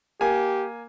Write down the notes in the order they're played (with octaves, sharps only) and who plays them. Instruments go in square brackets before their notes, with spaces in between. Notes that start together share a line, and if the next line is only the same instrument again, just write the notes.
[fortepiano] A#3 G#5 [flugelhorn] G4